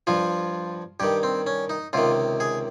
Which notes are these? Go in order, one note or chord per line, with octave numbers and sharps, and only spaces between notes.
G2 F3 F4
G2 D#3 G4
C4
C#4
D#4
C#2 C3 D#3 F4
G#4